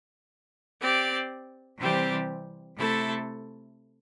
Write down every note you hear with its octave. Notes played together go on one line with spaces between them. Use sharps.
C4 G4 D5
C3 E3 G3 C4 G4
C3 A3 E4 A4